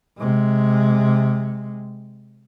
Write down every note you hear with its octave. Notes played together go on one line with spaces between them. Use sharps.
C3 G#3